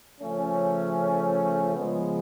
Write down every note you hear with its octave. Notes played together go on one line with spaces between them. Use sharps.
C#3 F3 A3 C#4
C#3 F3 G#3 B3